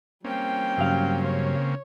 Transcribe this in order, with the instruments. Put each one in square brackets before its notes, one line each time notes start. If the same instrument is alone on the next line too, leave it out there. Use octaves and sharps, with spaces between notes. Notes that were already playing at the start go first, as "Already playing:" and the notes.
[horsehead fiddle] G3 G5 [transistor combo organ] A#3 C4 C#4
[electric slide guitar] G2 F#3 F5 [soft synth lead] C#3
[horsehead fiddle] C#5